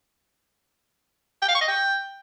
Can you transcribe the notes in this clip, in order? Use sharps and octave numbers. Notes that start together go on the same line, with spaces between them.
G5
F5
C#6
D#5
G5